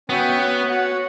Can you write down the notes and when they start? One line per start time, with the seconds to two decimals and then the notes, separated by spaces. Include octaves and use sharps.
0.09 B3 C#4 F#4 C#5 E5 G5
0.39 F#4 C#5 F#5
0.68 F#4 C#5 F#5